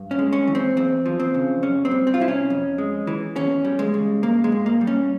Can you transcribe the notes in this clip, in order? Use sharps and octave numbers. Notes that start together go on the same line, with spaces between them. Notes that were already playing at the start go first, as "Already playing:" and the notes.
Already playing: G2
C#4
G#3
C#4
E3
C4
E2 C4
F3
C4
C#3
F2 C#4
C4
G3
C4
F4
C3 E4
C#4
F2
G#3
E3
E2 C#4
G3
G#3
C#3
G2 A#3
G#3
G2
A#3
G3
C#4